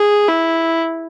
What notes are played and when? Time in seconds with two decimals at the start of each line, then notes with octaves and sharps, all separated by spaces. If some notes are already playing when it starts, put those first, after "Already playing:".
Already playing: G#4
0.28 E4